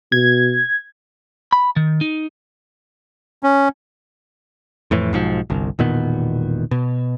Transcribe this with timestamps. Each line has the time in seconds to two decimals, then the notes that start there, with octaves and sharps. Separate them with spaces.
0.12 B2 G#6
1.53 B5
1.76 D#3
2.01 D#4
3.43 C#4
4.91 F2 A2 E3
5.13 B1 G#2 F3
5.50 G1 C2
5.79 E1 A#2 D#3 B3
6.71 B2